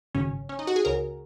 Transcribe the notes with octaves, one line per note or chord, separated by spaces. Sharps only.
G#1 F#2 C#3 C#4
C#4
D#4
F#4
G#4
C#2 C#3 A#4